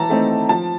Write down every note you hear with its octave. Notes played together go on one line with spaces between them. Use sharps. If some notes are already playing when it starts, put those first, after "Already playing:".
Already playing: E3 A5 A#5
A3 C4 D#4
F3 A5